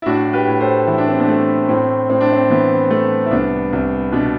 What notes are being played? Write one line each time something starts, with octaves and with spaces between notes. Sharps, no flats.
E4
A2 D4 F#4
G4 B4
A2
A4 C5
E3 E4
D4
C4
B3 D4
A3
A2 C4
A2 C4
D4
C4
E3 B3
A3
E4
C2 B3 D4
C2
B2 B3 D4